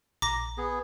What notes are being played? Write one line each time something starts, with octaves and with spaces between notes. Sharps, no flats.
A#1 A#5 D6 A#6
B3 G#4